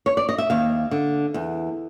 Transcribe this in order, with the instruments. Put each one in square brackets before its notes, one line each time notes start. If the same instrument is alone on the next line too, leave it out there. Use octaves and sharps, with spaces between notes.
[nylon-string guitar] C#5
D5
D#5
E5
D#2 F5
D3
E2